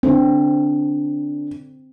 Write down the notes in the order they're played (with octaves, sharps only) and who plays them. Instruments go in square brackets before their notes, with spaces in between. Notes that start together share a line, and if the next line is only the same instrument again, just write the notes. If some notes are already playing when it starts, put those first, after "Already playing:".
[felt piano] D3 [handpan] C4